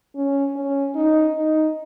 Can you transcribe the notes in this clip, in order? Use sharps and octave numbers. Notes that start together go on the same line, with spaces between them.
C#4
C#4
D#4
D#4